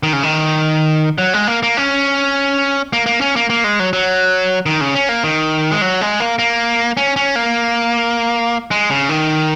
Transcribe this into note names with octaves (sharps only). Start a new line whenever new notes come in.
D#3
C#3
D#3
F#3
G#3
A#3
A#3
C#4
A#3
A#3
C#4
A#3
A#3
G#3
F#3
F#3
D#3
C#3
C#4
A#3
D#3
G#3
F#3
G#3
A#3
A#3
C#4
C#4
A#3
G#3
C#3
D#3